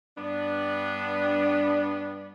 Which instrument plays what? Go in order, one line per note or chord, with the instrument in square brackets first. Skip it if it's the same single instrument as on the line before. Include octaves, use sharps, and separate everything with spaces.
[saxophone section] G2 B3 D4